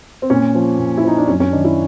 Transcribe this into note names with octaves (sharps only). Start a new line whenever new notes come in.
C4
A#2 C#4
F3
A#2
E4
F3 D#4
D4
F#2 C#4
C#4
D#3 D4
E4